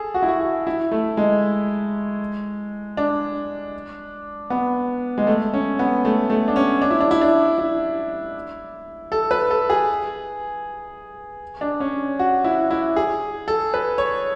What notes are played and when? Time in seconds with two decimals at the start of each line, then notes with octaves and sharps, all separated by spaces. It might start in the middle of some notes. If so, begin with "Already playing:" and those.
Already playing: G#4 A4
0.14 F#4
0.22 E4
0.28 F#4
0.40 F#4
0.67 E4
0.91 A3
1.17 G#3
2.97 D4
4.50 B3
5.18 G#3
5.27 A3
5.53 C#4
5.79 B3
6.05 A3
6.30 A3
6.48 D4
6.56 C#4
6.82 D4
6.91 E4
7.01 D4
7.11 E4
7.21 D4
7.58 E4
9.12 A4
9.31 B4
9.51 A4
9.70 G#4
11.61 D4
11.80 C#4
12.19 F#4
12.44 E4
12.71 E4
12.96 G#4
13.48 A4
13.74 B4
13.98 C#5